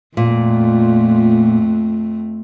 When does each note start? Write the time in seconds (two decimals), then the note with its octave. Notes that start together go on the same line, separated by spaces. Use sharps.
0.17 F2 A#2 A3